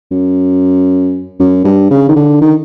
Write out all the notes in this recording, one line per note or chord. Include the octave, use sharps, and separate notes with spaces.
F#2
F#2
G2
C#3
D#3
D3
D#3